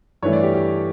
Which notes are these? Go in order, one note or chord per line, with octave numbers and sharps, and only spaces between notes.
G2 E3 A3 C#5
D5
G4
G4